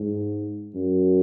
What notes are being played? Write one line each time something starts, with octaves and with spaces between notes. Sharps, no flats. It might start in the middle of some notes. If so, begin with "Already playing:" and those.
Already playing: G#2
F#2